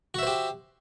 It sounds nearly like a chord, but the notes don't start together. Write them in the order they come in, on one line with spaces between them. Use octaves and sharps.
F#4 E5 C5 G4